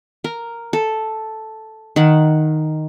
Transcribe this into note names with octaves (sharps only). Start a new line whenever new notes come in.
A#4
A4
D#3 F#5